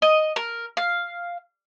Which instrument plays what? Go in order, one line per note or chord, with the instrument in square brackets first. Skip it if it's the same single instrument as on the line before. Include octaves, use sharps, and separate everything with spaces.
[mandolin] D#5
A#4
F5